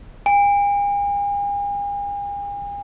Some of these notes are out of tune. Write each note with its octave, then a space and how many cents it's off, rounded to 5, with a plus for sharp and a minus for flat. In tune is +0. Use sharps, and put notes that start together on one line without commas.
G#5 -45